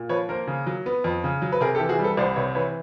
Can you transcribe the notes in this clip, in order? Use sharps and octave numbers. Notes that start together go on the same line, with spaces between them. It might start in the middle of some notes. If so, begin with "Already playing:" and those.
Already playing: A#2
F3 B4 C#5
A#3 A#4 C5
C#3
F#3
B3
F2
C#3
F#3
B4
C3 G#4 A#4
G4 A4
E3
F#4 G#4
G3
A4 B4
C2 C5 D5
C3 B4 C#5
E3 B4 C#5